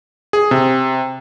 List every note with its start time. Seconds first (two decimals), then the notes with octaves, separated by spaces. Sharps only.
0.33 G#4
0.51 C3